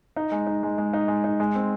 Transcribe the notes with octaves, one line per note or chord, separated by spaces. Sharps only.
D#4
G#3
D#4
G#3
G#3
D#4
G#3
D#4
G#3
C4